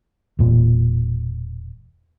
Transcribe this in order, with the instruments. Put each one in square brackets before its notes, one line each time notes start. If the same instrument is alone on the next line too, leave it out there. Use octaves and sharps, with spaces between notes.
[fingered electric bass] E1 A#2